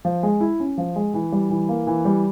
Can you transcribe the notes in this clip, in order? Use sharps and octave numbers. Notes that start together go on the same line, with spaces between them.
F3
G#3
E4
C#4
F3
G#3
E3
G3
E3
A#3
E3
G3